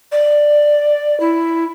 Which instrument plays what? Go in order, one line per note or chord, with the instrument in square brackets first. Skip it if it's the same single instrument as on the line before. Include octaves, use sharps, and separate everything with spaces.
[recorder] D5
E4